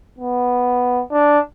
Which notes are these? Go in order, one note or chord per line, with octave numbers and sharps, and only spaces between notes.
B3
D4